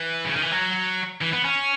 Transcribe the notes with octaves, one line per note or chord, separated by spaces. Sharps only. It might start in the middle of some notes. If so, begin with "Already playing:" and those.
Already playing: E3
C#3
D#3
E3
F#3
E3
B3
C#4